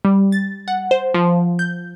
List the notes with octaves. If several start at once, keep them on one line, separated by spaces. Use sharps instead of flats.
G3
A6
F#5
C5
F3
G6